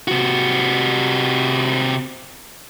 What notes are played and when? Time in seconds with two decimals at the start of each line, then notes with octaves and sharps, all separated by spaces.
0.08 C3 F#4